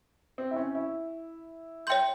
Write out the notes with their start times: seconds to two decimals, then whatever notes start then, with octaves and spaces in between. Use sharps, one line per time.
0.38 C4
0.51 E4
0.56 C#4
0.75 E4
1.87 C#5 E5 G5 C6 G6